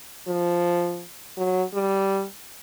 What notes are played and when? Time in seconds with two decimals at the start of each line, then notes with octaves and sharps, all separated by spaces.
0.28 F3
1.37 F#3
1.74 G3